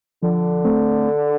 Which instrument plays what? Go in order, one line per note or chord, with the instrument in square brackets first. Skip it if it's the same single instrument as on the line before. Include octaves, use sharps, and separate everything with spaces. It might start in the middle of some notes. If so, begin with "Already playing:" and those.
[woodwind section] D3 [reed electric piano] F3
[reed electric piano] A3 C4